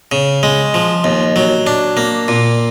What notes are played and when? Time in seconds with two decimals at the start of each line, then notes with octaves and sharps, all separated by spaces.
0.12 C#3
0.43 G#3
0.74 F3
1.04 D#2
1.36 F#3
1.67 D4
1.97 A#3
2.28 A#2